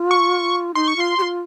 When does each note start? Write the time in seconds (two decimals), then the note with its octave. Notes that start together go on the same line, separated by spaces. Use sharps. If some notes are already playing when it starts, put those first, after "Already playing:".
Already playing: F4
0.11 C#6
0.74 D#4 C6
0.88 C#6
0.96 F4 C6
1.18 G4
1.22 F4